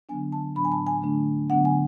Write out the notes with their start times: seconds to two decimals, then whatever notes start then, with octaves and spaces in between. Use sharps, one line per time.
0.09 D3 F#3 B3 D4 G#5
0.32 A5
0.56 A2 F#3 B3 D4 B5
0.65 G#5
0.72 A5
0.87 G#5
1.02 D3 A3 D4
1.50 D3 F#3 B3 D4 F#5
1.65 G#5